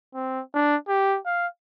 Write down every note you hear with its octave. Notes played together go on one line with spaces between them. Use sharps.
C4
D4
G4
F5